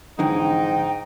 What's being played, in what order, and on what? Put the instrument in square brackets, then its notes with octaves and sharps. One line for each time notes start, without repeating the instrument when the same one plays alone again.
[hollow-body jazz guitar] F2 D3 E3 [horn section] G#2 D#4 [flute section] G5